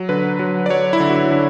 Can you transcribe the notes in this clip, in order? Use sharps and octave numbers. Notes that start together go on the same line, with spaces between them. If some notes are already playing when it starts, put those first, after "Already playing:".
Already playing: F#3
D3 B4
F#3
D5
F#3 C#5
E4
D3
F#4
E4
D3